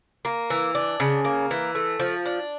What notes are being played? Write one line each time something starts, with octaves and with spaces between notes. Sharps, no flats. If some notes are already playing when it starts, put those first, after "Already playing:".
A#3
E3
D4
C#3
A#3
E3
A3
F3
D4